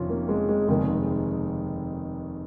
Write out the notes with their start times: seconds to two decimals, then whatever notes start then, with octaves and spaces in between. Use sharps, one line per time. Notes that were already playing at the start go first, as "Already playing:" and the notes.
Already playing: F1 F2 C3 D#3 C#4 F4
0.09 A#3
0.29 G#3
0.49 G#3
0.68 F1 D#2 D#3 G#3